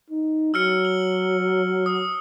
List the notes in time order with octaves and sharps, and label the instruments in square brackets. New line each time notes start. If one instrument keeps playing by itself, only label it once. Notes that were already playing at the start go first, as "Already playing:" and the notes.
[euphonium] D#4
[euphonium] F#3 [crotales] E6 F6 C#7
[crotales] F#7
D#6